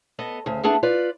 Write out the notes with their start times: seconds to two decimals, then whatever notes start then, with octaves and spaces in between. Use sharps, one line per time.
0.19 B3 A4 D#5
0.46 D2 C#3
0.64 A3 B3 D4 G#4 A4
0.83 F4 B4 D5